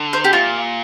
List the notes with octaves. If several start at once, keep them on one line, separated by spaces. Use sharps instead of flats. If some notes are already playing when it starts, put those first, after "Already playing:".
Already playing: D3
C5
G4
A#2 F4